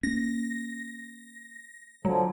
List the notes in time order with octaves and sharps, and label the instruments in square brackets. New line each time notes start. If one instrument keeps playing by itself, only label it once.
[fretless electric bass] A#3 C#4 [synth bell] A#6
[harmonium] D3 F3 [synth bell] F#3